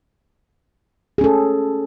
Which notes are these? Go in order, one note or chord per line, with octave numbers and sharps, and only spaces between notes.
C#4 G#4 A4